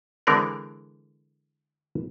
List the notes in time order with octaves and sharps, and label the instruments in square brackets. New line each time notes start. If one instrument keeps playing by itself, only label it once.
[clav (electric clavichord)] D3 E3 G#3 C4 A#4 D5